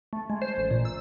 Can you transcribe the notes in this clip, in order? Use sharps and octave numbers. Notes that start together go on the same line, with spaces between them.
A3
G#3
C5
A1
A#2
E6